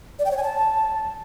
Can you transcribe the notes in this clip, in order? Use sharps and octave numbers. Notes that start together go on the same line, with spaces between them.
D5
G5
C#5
G#5
A5